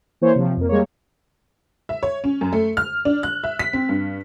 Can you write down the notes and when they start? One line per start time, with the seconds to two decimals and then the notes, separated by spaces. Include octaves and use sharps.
0.21 E3 A#3 C5 C#5
0.36 C3 F3
0.57 F2 A#3
0.69 G3 G#3 A#3 C#5
1.89 E5
2.03 C#5
2.24 C#4
2.41 F#2
2.53 A3
2.77 F6
3.05 D4
3.23 F#6
3.44 E5
3.59 B6
3.73 C4
3.89 G2